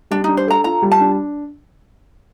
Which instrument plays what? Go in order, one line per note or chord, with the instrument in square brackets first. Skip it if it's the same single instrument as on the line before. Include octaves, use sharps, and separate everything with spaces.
[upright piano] G3 [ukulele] D4
[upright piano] D4 [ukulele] D#4
[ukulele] C5
[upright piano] A4 [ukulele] A#5
[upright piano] F4 [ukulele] A#5
[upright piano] G3
[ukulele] A5
[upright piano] D4